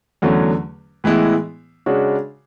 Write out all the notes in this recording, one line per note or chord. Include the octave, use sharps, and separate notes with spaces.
E2 D3 F#3 A3 C#4
A2 E3 G#3 B3 E4
C#3 G#3 D4 F#4 C#5